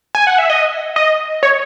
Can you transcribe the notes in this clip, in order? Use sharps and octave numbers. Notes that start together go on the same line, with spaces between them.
G#5
F#5
E5
D#5
D#5
C#5